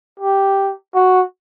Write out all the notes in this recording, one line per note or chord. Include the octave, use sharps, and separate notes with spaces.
G4
F#4